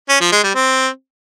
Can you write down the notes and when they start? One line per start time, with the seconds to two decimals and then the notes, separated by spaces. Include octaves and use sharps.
0.09 C#4
0.21 F3
0.32 G#3
0.44 G3
0.55 C4